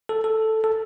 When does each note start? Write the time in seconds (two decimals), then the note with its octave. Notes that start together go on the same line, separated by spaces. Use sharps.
0.09 A4
0.24 A4
0.64 A4